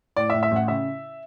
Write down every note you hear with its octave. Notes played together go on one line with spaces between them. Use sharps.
A2 D5
E5
A2
E5
A1 F#5
C#3 E5